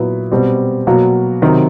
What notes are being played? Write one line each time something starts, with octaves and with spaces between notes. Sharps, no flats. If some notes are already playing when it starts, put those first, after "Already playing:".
Already playing: A#2 F#3 B3 E4
B2 G3 C4
B2 F#3 A#3
C3 D#3 F#3